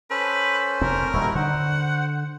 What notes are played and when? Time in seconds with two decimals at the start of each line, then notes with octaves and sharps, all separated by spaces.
0.10 C#4 A4 B4 C5
0.81 F1 A2 C4 A#4
1.13 D#1 G3 D#4 E4 F#4
1.35 D3 C5 F#5